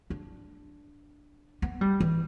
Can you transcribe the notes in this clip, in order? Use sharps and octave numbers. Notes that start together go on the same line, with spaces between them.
D4
B3
G3
E3